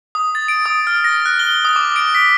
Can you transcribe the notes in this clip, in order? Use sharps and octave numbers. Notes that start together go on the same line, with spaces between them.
D#6
A6
D7
D#6
F6
A#6
F#6
G7
D#6
D6
D7
B6